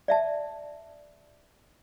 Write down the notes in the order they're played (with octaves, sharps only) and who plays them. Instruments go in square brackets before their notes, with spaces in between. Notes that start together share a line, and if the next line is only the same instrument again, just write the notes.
[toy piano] D5 E5 A5